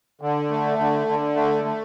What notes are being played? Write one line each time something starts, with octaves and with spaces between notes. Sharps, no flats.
D3
A3
D3
D3
A3
A3